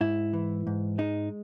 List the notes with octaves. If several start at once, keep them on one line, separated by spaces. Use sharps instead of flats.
G#2 E4
E3
G#2
G#3 D#4